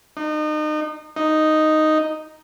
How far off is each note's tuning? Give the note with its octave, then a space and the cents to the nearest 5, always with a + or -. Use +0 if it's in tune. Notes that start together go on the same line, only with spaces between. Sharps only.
D#4 -35
D#4 -5